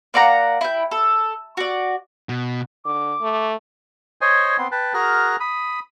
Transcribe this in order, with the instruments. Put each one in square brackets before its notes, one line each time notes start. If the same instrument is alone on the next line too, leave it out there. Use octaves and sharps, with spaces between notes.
[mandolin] A#3 D5 F#5 A#5
E4 G5
A4
F#4 D5
[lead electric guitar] B2
[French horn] D3 [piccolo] D6
[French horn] A3
[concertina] C5 C#5 D#5 G#5
B3 C4 C6
B4 G5 A5 F#6
F#4 G#4 A#4 A#5 F6 F#6
B5 D#6